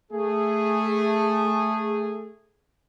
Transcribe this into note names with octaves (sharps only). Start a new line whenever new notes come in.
A3 G#4